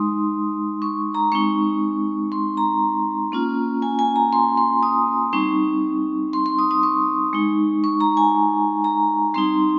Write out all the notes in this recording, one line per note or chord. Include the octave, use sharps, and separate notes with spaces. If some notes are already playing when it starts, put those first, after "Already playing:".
Already playing: G#3 D#4 C6 D#6
C#6
A#5
G#3 C4 D#4 C#6
C6
A#5
A#3 C#4 F4
G#5
G#5
A#5
C6
C6
D#6
G3 C4 D#4 C#6
C6
C6
D#6
D#6
C#6
G#3 D#4
C#6
A#5
G#5
A#5
G3 C4 D#4 C6